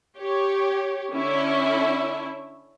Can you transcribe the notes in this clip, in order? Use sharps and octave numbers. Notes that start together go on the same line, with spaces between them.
G4 C#5
D3 C#4 E4 E5